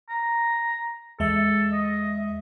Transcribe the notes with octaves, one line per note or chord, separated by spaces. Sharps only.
A#5
E2 G#3 A4 E5
D#5